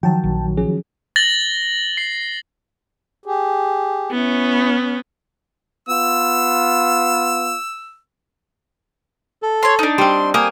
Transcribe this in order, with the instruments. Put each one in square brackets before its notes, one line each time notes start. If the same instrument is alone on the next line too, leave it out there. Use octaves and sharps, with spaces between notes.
[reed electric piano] D#3 F#3 F#4 [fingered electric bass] F3 [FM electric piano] G5 A5
[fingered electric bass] A#1
[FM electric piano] F3 C#4 G#4
[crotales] A6 A#6 F#7 G7
C7
[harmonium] G4 G#4
[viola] B3 C#4 [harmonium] E4
[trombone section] B3 F4 [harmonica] E6
[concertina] A4
[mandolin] C#5 C6
D4 D#4
[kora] G3 C4 [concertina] C6
[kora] A#3 [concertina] G5 G#5 [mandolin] D#6